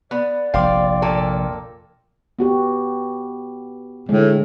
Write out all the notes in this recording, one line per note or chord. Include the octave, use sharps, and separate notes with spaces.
B3 D5
F1 A#1 F5 G5 C6 D6
A#2 A#3 A4
B3 F#4 G4
A2 D3 G#3